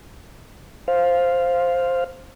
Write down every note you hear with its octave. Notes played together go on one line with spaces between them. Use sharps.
C5 F5